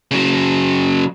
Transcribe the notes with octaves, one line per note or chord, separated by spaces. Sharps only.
C#3 F#3